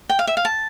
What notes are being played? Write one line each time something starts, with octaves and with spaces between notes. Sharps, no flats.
G5
F5
E5
F5
A5